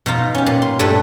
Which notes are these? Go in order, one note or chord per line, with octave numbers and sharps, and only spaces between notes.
B2 D#4 F4 A#5
C#4 G4
A#2
C6
G2 G3 A3 D4 E4 B4